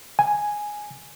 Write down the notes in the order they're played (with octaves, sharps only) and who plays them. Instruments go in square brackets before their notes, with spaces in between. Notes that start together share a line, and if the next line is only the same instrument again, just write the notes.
[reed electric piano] G#5